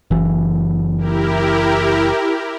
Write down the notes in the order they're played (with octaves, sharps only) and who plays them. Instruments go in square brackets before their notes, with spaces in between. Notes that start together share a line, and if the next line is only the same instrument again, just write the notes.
[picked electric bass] F#1 E3
[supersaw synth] E4 G4 A#4